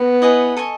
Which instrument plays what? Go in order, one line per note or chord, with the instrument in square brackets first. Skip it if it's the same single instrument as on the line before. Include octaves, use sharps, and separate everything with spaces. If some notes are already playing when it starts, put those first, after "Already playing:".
Already playing: [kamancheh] B3
[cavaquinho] E4 G#4 B4 D#5
A4 D#5 G#5 C#6